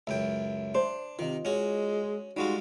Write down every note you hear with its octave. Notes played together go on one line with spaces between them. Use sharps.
C#2 F#2 E5 G5
D4 C5
C3 D#3 F4 D#5
G#3 C#4 F#4
G3 G#3 D#4 F4 F#4 G#4